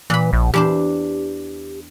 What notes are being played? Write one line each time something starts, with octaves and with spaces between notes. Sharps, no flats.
A#2 E3 B5
A#1
E2 D4 G4 C5